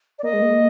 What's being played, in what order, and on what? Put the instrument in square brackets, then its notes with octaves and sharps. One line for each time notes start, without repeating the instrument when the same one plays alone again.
[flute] D5
[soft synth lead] A#3 [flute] D#5
[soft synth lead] G#3
A#3